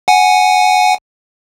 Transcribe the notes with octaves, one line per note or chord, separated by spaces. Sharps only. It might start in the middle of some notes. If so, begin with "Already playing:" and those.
F#5 G#5